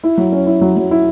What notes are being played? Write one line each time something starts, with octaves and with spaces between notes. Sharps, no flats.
E4
F#3
C#4
E4
F#3
F#3
E4